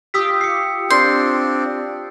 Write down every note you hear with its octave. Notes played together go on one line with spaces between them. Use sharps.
F4 G4 D#6 E6 B6
C7 C#7
C4 D4 C6 G6